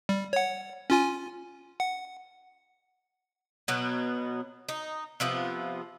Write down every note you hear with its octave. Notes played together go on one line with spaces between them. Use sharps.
G3
C#5 F#5
C#4 F4 G#5
F#5
B2 F#3 B3
D#4
C3 F3 B3